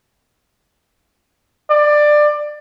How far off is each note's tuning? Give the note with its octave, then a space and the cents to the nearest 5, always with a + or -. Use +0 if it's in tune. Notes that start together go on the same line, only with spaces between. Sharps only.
D5 +20